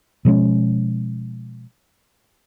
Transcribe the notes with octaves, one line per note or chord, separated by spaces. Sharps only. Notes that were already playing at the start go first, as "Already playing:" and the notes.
B2 F3 G#3 C#4